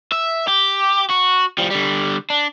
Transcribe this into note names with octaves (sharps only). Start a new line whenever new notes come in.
E5
G4
F#4
F3 G3
D3 G3
D4